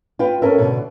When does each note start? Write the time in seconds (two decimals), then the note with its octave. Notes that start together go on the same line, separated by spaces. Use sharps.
0.19 F4 B4 G5
0.42 C#4 A4 A#4 E5
0.58 B2 D3